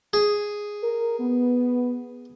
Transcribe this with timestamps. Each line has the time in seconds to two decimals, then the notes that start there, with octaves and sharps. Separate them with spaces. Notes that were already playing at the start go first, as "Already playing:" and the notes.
0.13 G#4
0.83 A#4
1.20 B3